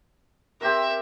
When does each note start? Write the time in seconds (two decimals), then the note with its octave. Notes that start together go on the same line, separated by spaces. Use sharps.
0.61 C4 G4 A#4 E5